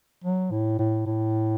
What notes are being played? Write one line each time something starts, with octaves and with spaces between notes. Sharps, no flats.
F#3
A2
A2
A2